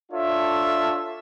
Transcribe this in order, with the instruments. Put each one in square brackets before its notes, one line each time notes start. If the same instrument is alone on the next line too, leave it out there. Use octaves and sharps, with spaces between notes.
[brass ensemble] D4 F4 A4 C#5 E5